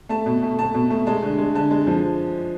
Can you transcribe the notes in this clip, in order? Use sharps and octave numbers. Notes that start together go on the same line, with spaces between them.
A3 A5
B2
A3
A3 A5
B2
A3
G#3 A5
D3
G#3
D3 A5
G#3
F3